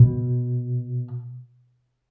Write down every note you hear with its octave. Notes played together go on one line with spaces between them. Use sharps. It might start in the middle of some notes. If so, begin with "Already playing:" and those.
Already playing: B2